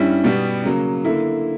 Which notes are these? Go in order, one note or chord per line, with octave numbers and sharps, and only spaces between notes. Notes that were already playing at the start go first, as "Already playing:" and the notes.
Already playing: G2 G3 C#4 E4
B2 G3 B3
C#3 F#3 A#3
D3 A#3 E4